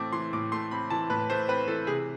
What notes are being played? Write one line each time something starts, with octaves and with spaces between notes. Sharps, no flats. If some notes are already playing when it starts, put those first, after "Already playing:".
Already playing: A2 E3 A3 C4 D6
E3 C6
A2 D6
A3 C6
C4 B5
E3 A5
A2 B4
A3 C5
C4 B4
E3 A4
C3 G#4